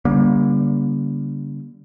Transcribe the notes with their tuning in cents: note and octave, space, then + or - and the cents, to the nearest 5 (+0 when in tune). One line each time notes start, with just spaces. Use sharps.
D3 -40 G3 +0 A#3 +35